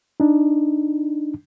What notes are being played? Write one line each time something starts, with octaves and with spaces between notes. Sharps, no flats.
D4 D#4